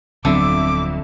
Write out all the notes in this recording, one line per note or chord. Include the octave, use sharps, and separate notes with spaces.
D1 F2 D3 F#3 B3 E5 D6